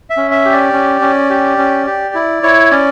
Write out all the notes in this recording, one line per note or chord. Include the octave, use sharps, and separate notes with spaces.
E5
C#4
E5
G4
D5
C#4
C#4
G4
C#4
G4
E4
E4 C#5
C#4 D5